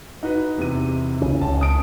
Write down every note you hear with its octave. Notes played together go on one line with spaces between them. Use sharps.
D#4 F#4 B4
E2 C3 D#7
C2 C#3 C#4
C#2 C#4 A5
D#6 D7